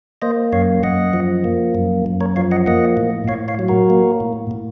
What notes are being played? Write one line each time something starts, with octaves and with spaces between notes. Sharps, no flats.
A#3 C5 D#5
F#2 C#5 F5
F#2 D#5 F#5
F3
A#3
F#2
F#2
A#4 C#5
F3 C#5 F5
D#5 F#5
A#3 D#5 F#5
A2
A2 C#5 F5
C#5 F5
F#3
F#4 A#4
A#3
A2
A2